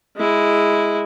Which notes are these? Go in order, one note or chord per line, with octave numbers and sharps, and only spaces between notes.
G#3 E4